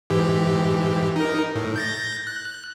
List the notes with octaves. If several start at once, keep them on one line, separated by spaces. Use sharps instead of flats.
G#2 E3 G4
D#4 A#4
A2
G6 A6 A#6
F#6